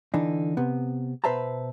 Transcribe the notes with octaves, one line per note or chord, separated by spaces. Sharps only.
D3 E3 D4 D#4
C3 B3
B2 B4 C5 E5 A5 A#5